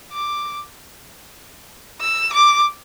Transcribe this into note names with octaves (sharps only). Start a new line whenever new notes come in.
D6
E6
D6